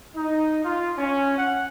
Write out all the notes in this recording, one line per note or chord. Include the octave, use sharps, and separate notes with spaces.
D#4
F4
C#4
F#5